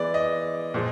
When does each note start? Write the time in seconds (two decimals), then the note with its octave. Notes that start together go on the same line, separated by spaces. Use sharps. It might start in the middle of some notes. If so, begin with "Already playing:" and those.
Already playing: E3 G#3 B3 D5
0.14 D#5
0.74 A#2 F3 G#3